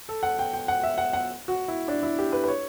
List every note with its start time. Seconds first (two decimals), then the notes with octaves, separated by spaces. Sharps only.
0.09 A4
0.23 F#5
0.39 G5
0.53 G5
0.68 F#5
0.83 E5
0.98 F#5
1.13 F#5
1.48 F#4
1.68 E4
1.88 D4
2.03 E4
2.19 G4
2.32 B4
2.44 B4
2.48 C#5